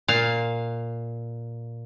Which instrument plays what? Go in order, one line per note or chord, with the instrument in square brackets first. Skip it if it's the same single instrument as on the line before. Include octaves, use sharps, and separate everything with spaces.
[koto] A#2 F5